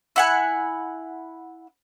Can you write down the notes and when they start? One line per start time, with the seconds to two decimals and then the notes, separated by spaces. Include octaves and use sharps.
0.16 E4 F#5 G#5